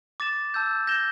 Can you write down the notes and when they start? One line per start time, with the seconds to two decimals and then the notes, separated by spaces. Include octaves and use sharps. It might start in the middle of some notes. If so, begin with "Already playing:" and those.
0.20 D6 A6 E7
0.54 A5 E6 G6
0.87 G6 A#6 E7 G7